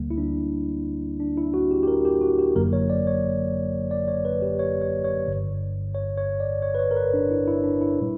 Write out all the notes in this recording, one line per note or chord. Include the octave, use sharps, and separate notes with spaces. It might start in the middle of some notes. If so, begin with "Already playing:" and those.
Already playing: D2 D3 G3 A#3
E4
D4
D4
E4
F#4
G4
G4
A#4
G4
F#4
G4
G1 F#2 D3 F#3 A#3 A#4
C#5
D5
C#5
D5
C#5
B4
G4
C#5
C#5
C#5
G1 G2 D3
C#5
C#5
D5
C#5
B4
C#5
A#4
B4
D4
E4
E4
D4
E4
A#2 G3